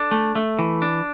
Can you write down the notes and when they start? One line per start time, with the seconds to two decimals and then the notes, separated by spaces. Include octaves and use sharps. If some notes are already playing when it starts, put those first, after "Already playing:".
Already playing: D4 A4
0.11 A3
0.35 A3
0.59 E3
0.82 D4